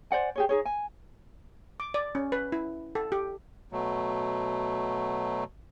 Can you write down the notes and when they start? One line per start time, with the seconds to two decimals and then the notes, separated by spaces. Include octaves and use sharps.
0.11 C5 D5 F#5 G#5
0.35 G4 G#4 C#5
0.49 D#4 G#4 C#5
0.65 G#5
1.80 D6
1.94 D5
2.15 C#4
2.32 B4
2.52 E4
2.95 A4
3.12 G4
3.72 B2 F#3 A3